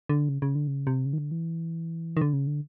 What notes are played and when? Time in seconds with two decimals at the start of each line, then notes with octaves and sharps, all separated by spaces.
0.09 D3
0.29 C#3
0.42 C#3
0.55 D3
0.67 C#3
0.87 C3
1.06 C#3
1.13 D#3
1.18 D3
1.31 E3
2.17 D#3
2.21 D3
2.33 C#3
2.47 D3